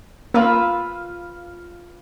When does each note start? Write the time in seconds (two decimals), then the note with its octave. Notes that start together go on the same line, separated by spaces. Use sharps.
0.34 A#3 F4 B4 E6